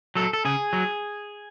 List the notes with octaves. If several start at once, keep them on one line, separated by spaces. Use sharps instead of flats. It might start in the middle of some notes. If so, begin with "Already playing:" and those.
F#3 A4
A4
C#3 G#4
F#3